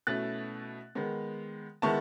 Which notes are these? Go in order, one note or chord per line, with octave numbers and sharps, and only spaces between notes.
B2 A3 C#4 E4 F#6 A6
D#3 G#3 B3
D#3 G#3 B3 E4 A5 C#6